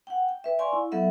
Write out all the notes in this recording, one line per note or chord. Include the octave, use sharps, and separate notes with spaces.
F#5 G5
G5
B4 E5
D5 F5 G#5 C6 C#6
E4
F#3 B3 A4 E5 F#5